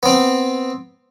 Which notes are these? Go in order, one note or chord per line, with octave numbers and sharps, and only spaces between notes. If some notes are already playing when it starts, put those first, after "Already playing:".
B3 C4